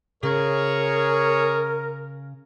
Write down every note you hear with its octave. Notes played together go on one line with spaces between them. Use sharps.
C#3 G#4 A#4 C#5